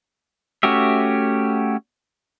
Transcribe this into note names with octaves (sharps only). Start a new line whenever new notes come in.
A3 C#4 F#4 G4 E5